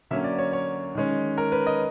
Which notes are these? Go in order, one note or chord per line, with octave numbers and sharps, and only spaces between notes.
D3 F#3 A#3 C#4 E5
D5
C#5
C#5
D#3 G#3 C#4
A#4
B4
D#5